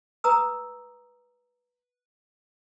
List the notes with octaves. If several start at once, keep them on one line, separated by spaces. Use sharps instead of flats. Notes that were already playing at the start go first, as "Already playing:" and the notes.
B4 A#5 D#6 E6